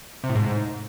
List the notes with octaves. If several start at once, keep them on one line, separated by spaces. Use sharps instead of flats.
C3
A2
G#2